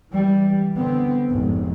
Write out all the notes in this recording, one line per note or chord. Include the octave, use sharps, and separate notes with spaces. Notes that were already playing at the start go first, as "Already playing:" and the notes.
E3 G3
D3 B3 C4
F1 G#2